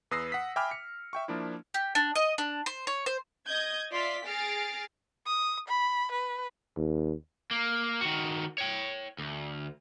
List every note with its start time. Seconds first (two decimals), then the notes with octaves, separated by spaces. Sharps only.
0.11 E2 B4 D#6 E6 A#6 C7
0.32 F#5 D#6 B6
0.56 E5 G5 G#5 B5 D6 F6
0.71 C#7
1.13 E5 G5 C#6
1.28 F3 A#3 D4 E4
1.74 G4
1.95 D4
2.15 D#5
2.38 D4
2.66 C5
2.87 C#5
3.06 C5
3.47 D#5 D#6 G6 G#6
3.92 F4 D5 E5 F5 C6 B6
4.25 G#4 F6 A6 A#6 C7 D7
5.27 D#6
5.69 B5
6.12 B4
6.77 D#2
7.51 A#3
8.01 D#3 F#4
8.58 C#5 G5
9.18 D2